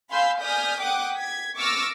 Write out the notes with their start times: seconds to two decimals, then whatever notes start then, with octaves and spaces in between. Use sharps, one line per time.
0.10 F5 G#5 B5 C6 E6 G6
0.40 D5 G#5 D#6 F6 G6 B6
0.81 F#5 G5 D6 D#6 F#6
1.12 G#6 B6
1.58 C#6 D6 E6 F6 A6 A#6